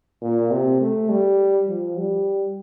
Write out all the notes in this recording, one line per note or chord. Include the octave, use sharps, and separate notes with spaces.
A#2
C3
A3
G3
F3
G3